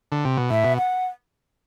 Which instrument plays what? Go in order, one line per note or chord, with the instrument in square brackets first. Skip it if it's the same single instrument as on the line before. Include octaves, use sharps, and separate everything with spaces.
[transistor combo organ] D3
C3
B2
[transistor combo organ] A2 [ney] E5
[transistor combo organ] B2
[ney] F#5